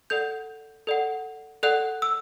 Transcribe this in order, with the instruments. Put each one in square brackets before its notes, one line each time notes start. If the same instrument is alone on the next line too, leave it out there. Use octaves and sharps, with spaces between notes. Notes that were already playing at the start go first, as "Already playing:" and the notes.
[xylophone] A4 D5 F#5 G6
A4 D5 F#5
A4 D5 F#5 F#6
E6